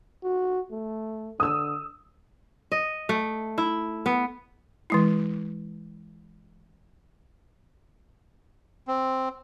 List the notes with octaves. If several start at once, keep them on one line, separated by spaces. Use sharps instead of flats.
F#4
A3
D3 D#6 E6
D#5
A3
E4
B3
E3 G#3 E4
C4